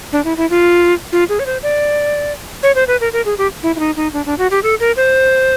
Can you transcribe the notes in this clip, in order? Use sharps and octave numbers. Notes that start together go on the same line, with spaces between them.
D4
E4
E4
F4
F4
G#4
C#5
C5
D5
C#5
C5
B4
A#4
A#4
G#4
G4
E4
E4
D#4
D#4
D4
D4
F#4
G4
A4
A#4
C5